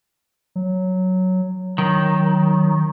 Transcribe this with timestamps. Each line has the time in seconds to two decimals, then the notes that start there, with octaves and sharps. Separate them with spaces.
0.56 F#3
1.78 D#3 F#3